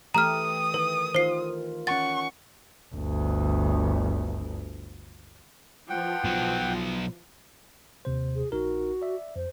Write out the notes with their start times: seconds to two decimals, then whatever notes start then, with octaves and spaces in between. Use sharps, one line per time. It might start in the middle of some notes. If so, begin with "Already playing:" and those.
0.15 E3 A3 G4 A#5 D#6 F6
0.74 D#3 B4
1.15 D#3 F4 C5 C7
1.87 C#4 F#5 C#6 A6
2.95 G1 D2
5.90 E3 F3 F4 F#5 G5
6.24 B2 F#3
8.05 D#2 C3 C5
8.35 G#4
8.52 A#1 D#4 F#4 A#4
9.02 D5 E5
9.36 F2 C5